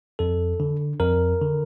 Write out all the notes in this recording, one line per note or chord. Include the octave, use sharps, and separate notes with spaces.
F2 A4
D3
F2 A#4
D3